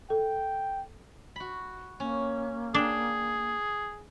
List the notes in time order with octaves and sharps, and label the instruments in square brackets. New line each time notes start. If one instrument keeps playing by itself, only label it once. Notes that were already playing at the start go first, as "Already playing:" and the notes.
[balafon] A4 [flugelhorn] G5
[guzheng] F#4 B5
[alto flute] A#3 [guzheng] C#4
[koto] D4 [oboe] G#4 [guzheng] D5 G5